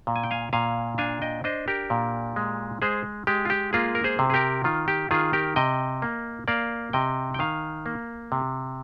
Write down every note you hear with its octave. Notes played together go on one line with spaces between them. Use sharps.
A#2
G#5
G5
F5 G#5
A#2 F5 G#5
D4 F5 G#5
D#5 G5
D4 C5 D#5
G4 A#4
A#2
G#3
G#3 G#4 C5
G#3 G4
F4
G4
A#3 F4 G#4
A#4
G#4 C5
C3
G#4
G4 A#4
D#3 F4
G4
D#3 F4 G#4
G4 A#4
C3 D#5 G5
A#3
A#3 D5 F5
C3 D#5 G5
G5
D#3 F5 G#5
A#3
C3